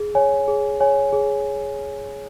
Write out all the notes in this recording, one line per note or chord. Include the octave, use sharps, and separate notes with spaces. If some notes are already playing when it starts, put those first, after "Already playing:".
Already playing: G#4
C#5 G#5
G#4
C#5 G#5
G#4